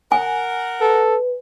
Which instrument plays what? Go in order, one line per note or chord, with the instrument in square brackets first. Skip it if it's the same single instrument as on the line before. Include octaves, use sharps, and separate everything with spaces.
[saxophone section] A#4 F#5 [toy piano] G#5
[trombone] A4 [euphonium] B4